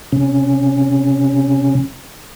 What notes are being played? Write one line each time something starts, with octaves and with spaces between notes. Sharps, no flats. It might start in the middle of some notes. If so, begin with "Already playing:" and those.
C3 C#4